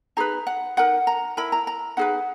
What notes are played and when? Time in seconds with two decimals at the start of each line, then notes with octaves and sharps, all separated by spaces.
0.17 D#4 G#4 B4 A#5
0.47 F#5
0.77 D#4 A#4 F#5
1.07 A#5
1.37 E4 A#4 B5
1.52 A#5
1.67 A#5
1.97 D#4 G#4 B4 F#5